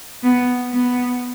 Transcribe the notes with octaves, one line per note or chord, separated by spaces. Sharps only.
B3
B3